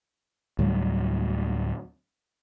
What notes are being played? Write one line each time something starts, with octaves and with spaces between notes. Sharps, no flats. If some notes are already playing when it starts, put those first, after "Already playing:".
D2 A2 F#3 G3